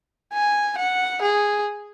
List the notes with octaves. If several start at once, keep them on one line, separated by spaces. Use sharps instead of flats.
G#5
F#5
G#4